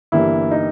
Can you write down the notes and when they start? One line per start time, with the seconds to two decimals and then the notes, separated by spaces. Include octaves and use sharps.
0.12 G1 G2 E3 G3 A#3 E4
0.51 D#4